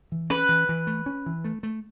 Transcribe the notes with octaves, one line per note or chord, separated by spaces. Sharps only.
E3
C#4 B4
E3
E3
A3
C#4
E3
A3
A3